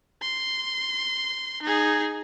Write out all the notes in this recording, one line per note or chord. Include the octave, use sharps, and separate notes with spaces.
C6
D#4 G#4